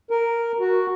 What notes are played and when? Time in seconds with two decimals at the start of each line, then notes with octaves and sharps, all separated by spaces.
0.10 A#4
0.60 F#4